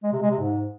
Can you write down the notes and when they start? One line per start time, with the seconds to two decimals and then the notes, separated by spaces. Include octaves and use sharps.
0.03 G#3
0.12 C3
0.21 G#3
0.31 C3
0.40 G#2